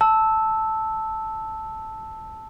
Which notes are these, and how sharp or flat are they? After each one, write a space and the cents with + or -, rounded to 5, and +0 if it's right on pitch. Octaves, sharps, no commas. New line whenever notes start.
A5 +0 E6 -10